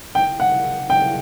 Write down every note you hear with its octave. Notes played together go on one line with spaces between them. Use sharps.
G5
F#5
G5